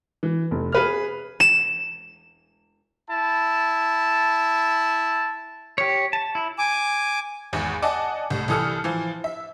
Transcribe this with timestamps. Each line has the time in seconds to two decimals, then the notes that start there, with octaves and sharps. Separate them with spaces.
0.23 E3
0.51 F1
0.72 G#4 B4 F6
1.40 E7
3.09 E4 A5
5.78 G4 C#5
6.13 A5
6.35 E4
6.58 G#5 D6
7.53 G#1 E2
7.82 D5 D#5 F#5 G#5 A5 D6
8.30 C2 A2
8.48 C2 E3 A4 D#6 F6 C#7
8.84 E3 F3
9.24 E5